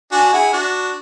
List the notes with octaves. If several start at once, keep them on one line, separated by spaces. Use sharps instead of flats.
D4 F#4 G#5
E4 G#4 F#5
D4 F#4